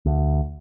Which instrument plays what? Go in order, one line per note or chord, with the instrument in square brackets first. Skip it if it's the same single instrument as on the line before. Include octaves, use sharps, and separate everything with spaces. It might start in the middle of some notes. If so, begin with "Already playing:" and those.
[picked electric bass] D2